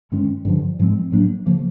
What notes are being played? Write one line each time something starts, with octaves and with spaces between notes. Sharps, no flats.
G2 D#3 G#3 C#4
G2 D3 F3
G#2 F3 G#3 C4
A2 F#3 A#3 D4
C#3 F3 A#3